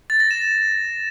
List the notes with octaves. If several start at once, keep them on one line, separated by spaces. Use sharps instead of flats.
A6
A#6
E7